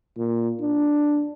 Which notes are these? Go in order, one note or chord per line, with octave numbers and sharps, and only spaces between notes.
A#2
D4